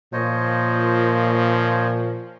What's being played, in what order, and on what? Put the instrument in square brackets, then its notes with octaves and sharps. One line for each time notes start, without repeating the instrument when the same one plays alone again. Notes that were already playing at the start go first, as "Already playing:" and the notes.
[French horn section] A#2 [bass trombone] F3 [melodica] C5 C#5 D#5